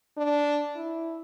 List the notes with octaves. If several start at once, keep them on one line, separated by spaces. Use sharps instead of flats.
D4
E4